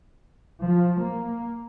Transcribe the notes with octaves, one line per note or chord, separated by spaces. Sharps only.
F3
A#3